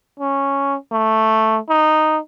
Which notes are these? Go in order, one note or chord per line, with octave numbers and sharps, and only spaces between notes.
C#4
A3
D#4